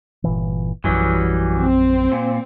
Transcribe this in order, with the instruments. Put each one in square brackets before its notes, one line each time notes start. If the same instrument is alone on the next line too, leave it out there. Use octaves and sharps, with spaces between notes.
[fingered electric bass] G1 A#2 E3
[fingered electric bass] A#1 F#2 [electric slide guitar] E3 F#3 G3
[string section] C4
[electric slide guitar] A#2